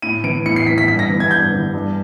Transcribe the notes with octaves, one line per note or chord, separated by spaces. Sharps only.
A2 D#7
E3 D7
A2 C#7
C7
E3 B6
B6
G2 B6
A#6
E3
G#6
G2 G6
E3
G2